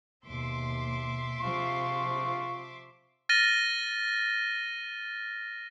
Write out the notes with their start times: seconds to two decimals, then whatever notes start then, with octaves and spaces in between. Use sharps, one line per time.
0.26 D#2 B2 E5 C6 D6
1.40 C3 F3 F4 C#6
3.29 F6 A6 A#6 D#7 G7